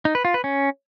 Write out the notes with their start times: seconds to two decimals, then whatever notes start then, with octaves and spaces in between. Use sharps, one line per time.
0.05 D#4
0.15 B4
0.25 F4
0.34 B4
0.44 C#4